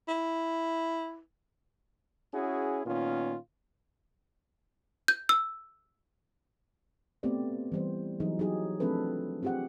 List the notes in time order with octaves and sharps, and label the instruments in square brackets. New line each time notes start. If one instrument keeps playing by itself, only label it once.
[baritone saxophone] E4
[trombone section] C#4 E4 F#4 G#4
A#2 D#3 B3 C#4 F4
[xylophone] G6
E6
[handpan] A3 B3 C4 G4 B4 D5
E3 G3 C5
E3 F#3 D#4 G#4
F#3 D#4 G4 G#4
F3 A3 C4 D4 A4 B4
C4 F4 G4 G#4 F#5